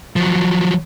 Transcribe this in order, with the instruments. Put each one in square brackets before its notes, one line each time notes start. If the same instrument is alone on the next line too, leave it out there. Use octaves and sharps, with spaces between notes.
[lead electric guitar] F3 F#3